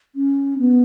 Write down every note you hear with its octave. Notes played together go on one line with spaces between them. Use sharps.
C#4
B3